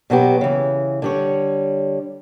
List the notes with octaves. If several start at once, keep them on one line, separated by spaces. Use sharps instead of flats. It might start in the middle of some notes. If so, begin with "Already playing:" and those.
B2 F#3 B3 G4
C#3 E3
D3 G3 C#5